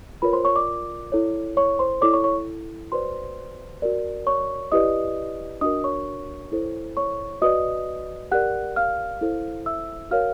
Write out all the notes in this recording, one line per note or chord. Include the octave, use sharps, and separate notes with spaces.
F4 A#4 B4 C#5 B5
C5 C6
C#5 C#6
D5 D6
E4 A4 C#5
C#5 C#6
C5 C6
E4 A4 C#5 D5 D6
C#5 C#6
C#5 C#6
F#4 B4 C5 D5 C6
F#4 A#4 D5
C#5 C#6
E4 G4 B4 D5 D#5 D#6
D4 F#4 A#4 D#5 D#6
C#5 C#6
E4 A4 C5
C#5 C#6
F#4 B4 D5 D#5 D#6
G4 A#4 D5 F#5 F#6
F5 F6
E4 A4 C5
E5 E6
F#4 A#4 C#5 F5 F6